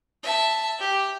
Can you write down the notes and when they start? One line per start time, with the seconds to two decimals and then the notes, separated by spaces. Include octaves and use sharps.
0.23 E5 A5
0.79 G4